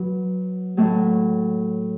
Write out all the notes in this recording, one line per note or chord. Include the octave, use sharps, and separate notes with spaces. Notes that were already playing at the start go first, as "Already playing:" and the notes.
Already playing: F#3 B4
A2 F#3 A3